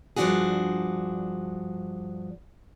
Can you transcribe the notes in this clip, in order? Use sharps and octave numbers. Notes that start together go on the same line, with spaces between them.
G2 F3 A3 D4 F#4 G#4